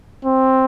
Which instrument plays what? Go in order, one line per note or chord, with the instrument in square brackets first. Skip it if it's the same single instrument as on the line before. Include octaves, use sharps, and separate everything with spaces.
[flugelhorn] C4